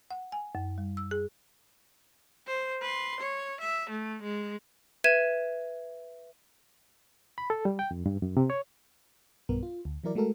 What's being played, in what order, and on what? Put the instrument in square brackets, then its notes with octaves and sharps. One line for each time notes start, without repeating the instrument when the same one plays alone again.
[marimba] F#5
G#5
F#2
G3
E6
G#4
[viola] C5
B4 C6
C#5
E5
A3
G#3
[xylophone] B4 E5 G#6 D#7 E7
[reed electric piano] B5
A4
G3
G5
F2
G2
F#2
C3
C#5
[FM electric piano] B1 G2 B3 A#4
F4
D2
E3 F#3 E4 A#4 D5
G#3 A3 F#4 A4 A#4